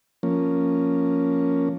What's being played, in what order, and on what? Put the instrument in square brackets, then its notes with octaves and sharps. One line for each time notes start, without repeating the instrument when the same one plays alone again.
[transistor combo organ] F3 A#3 C#4